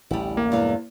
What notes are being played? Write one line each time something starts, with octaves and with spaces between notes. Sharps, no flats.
A1 D2 G3 E4
A#3
E2 G2 B2 G#3 F5